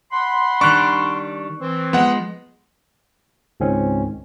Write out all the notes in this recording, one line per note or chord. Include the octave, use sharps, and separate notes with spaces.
F#5 B5 C6
D#3 G3 D4 C#6 F#6
E3 C4
F3 G#3 B3 F#5
C#2 G#2 D#3 G#3 C4 C#4